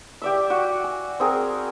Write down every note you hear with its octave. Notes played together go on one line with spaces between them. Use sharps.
G4 D5 E5
F#4
G#5
C4 G#4 A#4